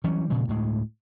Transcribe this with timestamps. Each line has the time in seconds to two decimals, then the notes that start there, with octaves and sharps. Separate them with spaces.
0.04 E3 F#3 G3 C#4
0.30 A#2 C#3 F3 G#3
0.48 D2 A2 G#3